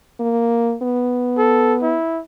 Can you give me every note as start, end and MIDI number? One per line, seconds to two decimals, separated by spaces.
0.20 0.75 58
0.83 1.97 59
1.38 1.75 69
1.83 2.21 64